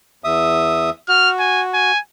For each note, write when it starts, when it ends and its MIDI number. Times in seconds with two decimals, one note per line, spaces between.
0.24 0.90 40
0.24 0.90 76
0.24 0.90 87
1.09 1.91 66
1.09 1.30 89
1.39 1.63 80
1.74 1.99 80